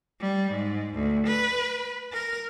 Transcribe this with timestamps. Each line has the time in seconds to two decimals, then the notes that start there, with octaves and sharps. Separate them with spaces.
0.21 G3
0.52 G#2
0.95 D2
1.27 B4
2.13 A#4